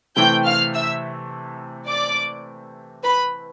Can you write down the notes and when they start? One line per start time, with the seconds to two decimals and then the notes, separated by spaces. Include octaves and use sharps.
0.16 C3 E3 A3 C4 G5 G6
0.46 F5 F6
0.74 E5 E6
1.89 D5 D6
3.04 B4 B5